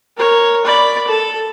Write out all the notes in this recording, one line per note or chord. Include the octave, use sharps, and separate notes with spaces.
A#4 C#5
D5 B5
A4